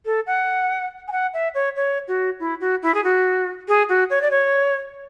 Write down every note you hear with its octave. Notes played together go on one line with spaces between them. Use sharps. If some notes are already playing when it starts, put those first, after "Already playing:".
A4
F#5
G#5
F#5
E5
C#5
C#5
F#4
E4
F#4
E4
G#4
F#4
G#4
F#4
C#5
D5
C#5